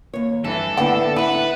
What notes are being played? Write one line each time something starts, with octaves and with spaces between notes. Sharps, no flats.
D#2 C#5
G2 E3 A4
D3 A3 B3 E4 F#5 G5
B3 D4 E4 B4 F#5